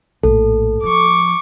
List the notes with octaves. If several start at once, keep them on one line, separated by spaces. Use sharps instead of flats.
A#1 A2 A4
F3 C#6 D6